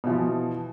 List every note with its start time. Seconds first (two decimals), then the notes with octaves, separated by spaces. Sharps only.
0.04 B2
0.07 E3
0.10 F3